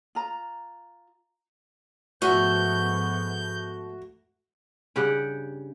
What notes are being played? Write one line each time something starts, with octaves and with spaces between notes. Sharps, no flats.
F4 A#5
G#2 F3 A3 B3 F#4 G6
G2 C#3 G4 F#5